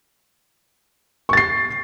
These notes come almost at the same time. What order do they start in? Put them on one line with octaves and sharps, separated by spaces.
C#6 A6 C7